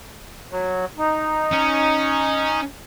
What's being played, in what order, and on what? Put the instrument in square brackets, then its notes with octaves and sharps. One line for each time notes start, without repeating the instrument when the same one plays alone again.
[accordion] F#3
D#4
[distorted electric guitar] C#4